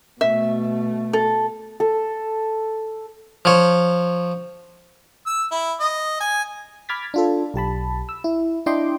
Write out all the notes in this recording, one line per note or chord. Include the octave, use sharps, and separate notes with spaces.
B2 A3 E5
A4
A4
F3 C#5
E6
E4
D#5
G#5
B5 D6 F6 G#6 A6 B6
D4 F4 A4
B1 G4 A5 B5
E6
E4
D4 E4 D#5 G5 C6 D6